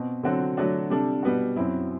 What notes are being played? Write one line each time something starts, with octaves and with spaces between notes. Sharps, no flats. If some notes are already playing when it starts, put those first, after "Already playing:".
Already playing: B2 C4
D3 F#3 C4 F#4 A4
D3 F#3 A3 D4 F#4
C3 G3 D4 A4
B2 G3 B3 F#4
F#2 F#3 C4 E4